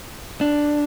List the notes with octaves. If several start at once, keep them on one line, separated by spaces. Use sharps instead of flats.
D4